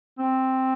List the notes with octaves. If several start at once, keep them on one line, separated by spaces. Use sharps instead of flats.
C4